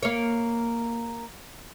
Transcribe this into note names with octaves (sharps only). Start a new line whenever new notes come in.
A#3 C#5